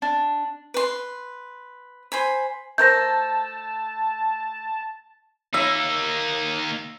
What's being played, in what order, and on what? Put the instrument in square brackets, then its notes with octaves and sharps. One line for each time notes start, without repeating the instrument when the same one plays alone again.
[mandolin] D4
[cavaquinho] B4 C6
C5 G#5 B5
[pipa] A3 A#4 C5 [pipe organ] A5 [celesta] G6 A#6
[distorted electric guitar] A#3 D#4 [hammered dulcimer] E5